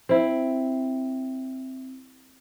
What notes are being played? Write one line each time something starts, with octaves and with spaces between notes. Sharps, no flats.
C4 E4